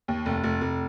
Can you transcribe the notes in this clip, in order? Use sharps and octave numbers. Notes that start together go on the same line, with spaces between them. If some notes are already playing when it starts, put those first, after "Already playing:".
D#2
F1
F1
F1